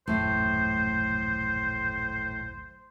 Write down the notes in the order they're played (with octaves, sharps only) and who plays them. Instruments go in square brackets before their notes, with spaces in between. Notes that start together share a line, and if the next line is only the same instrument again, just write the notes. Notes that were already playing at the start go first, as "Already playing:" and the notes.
[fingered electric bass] D#1 A1 F#2 [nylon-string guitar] A2 A3 [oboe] C5